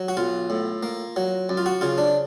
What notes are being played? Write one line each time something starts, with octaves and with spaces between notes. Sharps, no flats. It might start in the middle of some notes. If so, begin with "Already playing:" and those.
Already playing: F#3
F#4
B1 F4
A2
A#3
F#3
F#2
F4
F#4
C#3 F4
D4